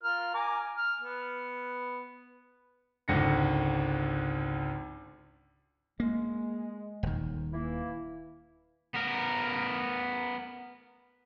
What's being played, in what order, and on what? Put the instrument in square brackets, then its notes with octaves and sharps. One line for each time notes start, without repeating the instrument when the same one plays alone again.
[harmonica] F4 A#4 F6
G#5 A#5 D6
F6
B3
[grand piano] G#1 C#2 D3 A#6 C#7
[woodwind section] G#3 [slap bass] A#3
[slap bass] D#1 D#3
[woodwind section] E3 A#3 E4
[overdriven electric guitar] B3 A#4